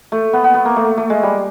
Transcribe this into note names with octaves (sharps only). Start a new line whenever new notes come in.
A3
B3
B3
B3
A#3
A3
A3
G#3
G3